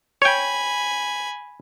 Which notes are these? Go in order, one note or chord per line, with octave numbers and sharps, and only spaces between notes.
C#5 G5 G#5 B5